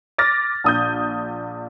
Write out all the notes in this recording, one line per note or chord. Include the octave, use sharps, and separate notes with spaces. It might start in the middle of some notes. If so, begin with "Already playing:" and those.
D6 F6 A6 A#6
A#1 D#6 G6